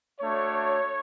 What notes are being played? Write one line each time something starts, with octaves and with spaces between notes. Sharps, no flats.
A3 D4 F#4 C#5